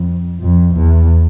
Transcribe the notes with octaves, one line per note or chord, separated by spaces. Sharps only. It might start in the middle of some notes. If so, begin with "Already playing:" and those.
Already playing: F2
F2
E2